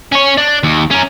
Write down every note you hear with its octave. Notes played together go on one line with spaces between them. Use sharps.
C#4 C#5
D4
D#2
C#4 A#4